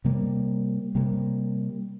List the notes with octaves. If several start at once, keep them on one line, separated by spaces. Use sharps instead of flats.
C3 G3 A#3
C3 G3 A#3